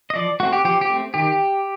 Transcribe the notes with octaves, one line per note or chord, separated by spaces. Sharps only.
D#5
F3 D5
A3 C4 F#4
G4
F3 G4
G4
A3 C4
D#3 G4